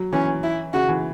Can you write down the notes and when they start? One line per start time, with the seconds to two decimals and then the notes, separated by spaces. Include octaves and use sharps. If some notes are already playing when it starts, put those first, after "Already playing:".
Already playing: F#3
0.13 E3 C#4
0.43 E4
0.73 C#3 F#4
0.89 E3